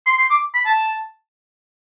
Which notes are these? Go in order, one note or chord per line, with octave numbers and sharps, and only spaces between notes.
C6
C6
D6
B5
A5